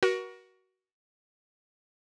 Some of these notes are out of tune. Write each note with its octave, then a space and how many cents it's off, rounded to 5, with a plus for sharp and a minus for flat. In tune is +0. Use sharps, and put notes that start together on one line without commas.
F#4 +15 A#4 +40